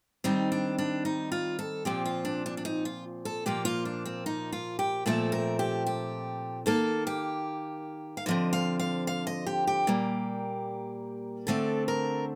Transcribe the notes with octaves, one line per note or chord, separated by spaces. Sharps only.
D#3 G3 C4 D#4
D4
D4
D#4
F4
A4
A#2 F3 C4 G4
F4
D4
D4
D4
D#4
F4
A4
A#2 F3 A#3 G4
F4
D4
C4
D#4
F4
G4
A#2 F3 A3 C4 A4
A#4
G4
G4
D#3 A#3 A4
G4
F5
D3 F3 C4 D#5
F5
F5
F5
D#5
G4
G4
A#2 G3 A#3
D3 A3 C4 A4
A#4